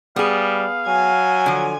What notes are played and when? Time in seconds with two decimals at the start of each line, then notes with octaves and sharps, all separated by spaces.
0.16 G3 B3 G#4 F5
0.87 F#3 G#5
1.46 D3 F3